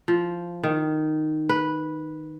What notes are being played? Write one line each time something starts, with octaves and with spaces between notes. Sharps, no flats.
F3
D#3
B4